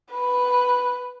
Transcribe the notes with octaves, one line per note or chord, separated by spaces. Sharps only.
B4